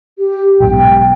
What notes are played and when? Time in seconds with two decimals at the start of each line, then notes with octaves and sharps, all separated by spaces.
0.18 G4
0.60 B1 G#2 B2 G5